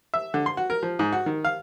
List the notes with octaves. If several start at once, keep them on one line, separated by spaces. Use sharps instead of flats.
E5
D3
C6
F#4
A#4
F3
G#2
F#4
D#3
F5